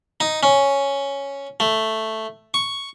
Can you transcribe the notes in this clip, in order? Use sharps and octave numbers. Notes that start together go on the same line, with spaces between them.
D#4
C#4
A3
C#6